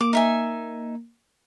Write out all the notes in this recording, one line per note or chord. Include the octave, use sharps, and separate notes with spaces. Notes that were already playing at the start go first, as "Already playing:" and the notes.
A#3 D6
D#4 E5 G#5